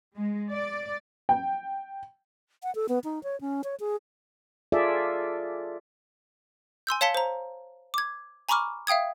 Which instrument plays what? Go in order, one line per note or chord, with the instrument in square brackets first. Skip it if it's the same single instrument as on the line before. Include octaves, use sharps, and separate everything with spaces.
[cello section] G#3
D5
[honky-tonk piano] G5
[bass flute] F#5
A4
B3
D#4
C#5
C#4
C#5
G#4
[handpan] F4 G#4 A4 D5 E5
[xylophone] G#5 C6 E6 G6
C#5 F5 A5 B6 C#7 G7
C5 A#5
D6 G#6
G#5 A#5 B5 C#6 D6 F6
E5 F5 G5 D#6 G#6